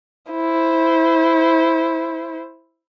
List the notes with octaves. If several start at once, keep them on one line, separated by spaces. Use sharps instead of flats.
E4 C5